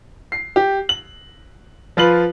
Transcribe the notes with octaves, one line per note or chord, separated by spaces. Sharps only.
C7
G4
F#7
F3 F4 B4 F#7